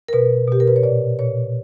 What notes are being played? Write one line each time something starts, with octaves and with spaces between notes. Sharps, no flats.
A#4
B2 B4
B2 G4
A#4
B4
C#5
A#2 D5
A#2 C#5